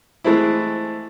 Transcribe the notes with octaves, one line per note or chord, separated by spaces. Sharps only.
E3 G#3 A3 C4 E4